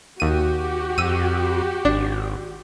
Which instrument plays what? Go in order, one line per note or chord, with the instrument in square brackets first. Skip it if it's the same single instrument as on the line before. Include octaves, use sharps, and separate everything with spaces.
[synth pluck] D#2 D#7 [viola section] F#4 G4
[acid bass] F2 [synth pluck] E6 D#7
[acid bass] G#1 [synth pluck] D4